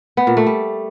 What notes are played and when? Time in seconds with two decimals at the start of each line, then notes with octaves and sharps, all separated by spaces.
0.17 B3
0.27 A#2
0.37 A3
0.46 G3